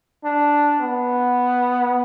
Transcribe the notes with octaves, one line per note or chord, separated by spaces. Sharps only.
D4
B3